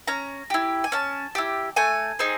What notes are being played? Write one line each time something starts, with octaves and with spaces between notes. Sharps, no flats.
C#4 A#5
E4 G4
G#5
C#4 A5
E4 G4
A3 G#5
C4 D#4 G#4